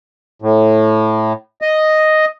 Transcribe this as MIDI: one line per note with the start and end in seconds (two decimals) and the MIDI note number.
0.42 1.33 45
1.62 2.25 75